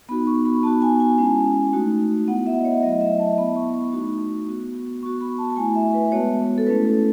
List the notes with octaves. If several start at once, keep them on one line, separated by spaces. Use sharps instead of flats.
B3 D#4 F#4 B5
C#6
B5
B3 D#4 F#4 A5
G#5
G#5
G#3 C#4 E4
A3 D#4 F#4
B3 E4 F#5
E5
D#5
C#5
F#3 A3 E4 D#5
E5
A5
B3 E4 B5
C#6
C#6
A3 D#4 F#4
B3 F#4
B3 F#4 C#6
B5
A5
A5
A3 E4 G#5
E5
B4
G#3 B3 F#4 C#5
A4
A3 C#4 E4 B4
A4